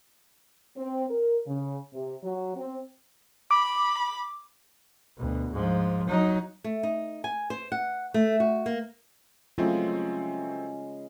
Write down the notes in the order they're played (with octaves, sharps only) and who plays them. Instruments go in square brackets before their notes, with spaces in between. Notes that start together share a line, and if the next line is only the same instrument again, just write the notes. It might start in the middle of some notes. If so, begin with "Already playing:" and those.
[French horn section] C4
A#4
C#3
C3
F#3
C4
[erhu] B5 [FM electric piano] D6
[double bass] D2 B2
G#2 F3
F#3 D#4
[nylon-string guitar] A3
D#4
G#5
C5
F#5
A3
F#4
A#3
[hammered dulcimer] C#3 G#3 [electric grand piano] F#3 A3 C4 [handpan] F4